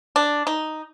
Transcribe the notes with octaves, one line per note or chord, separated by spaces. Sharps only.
D4
D#4